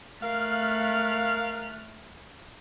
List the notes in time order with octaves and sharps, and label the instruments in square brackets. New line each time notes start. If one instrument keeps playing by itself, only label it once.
[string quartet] A3 F6 F#6 [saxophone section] A#4 F5